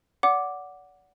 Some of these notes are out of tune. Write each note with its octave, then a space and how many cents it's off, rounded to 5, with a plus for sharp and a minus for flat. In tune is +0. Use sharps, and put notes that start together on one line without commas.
D5 -40 F#5 +0 D6 +0